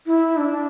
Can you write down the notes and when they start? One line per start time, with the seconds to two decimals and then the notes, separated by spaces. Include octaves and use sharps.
0.06 E4
0.37 D4